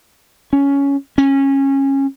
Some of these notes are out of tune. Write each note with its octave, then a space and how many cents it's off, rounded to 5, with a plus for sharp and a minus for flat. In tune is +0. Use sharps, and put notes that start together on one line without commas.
C#4 +10
C#4 -20